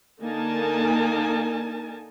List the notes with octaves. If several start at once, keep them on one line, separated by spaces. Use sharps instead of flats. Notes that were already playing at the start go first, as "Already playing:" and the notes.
D3 A#3 D#4 A#4 G#5 A5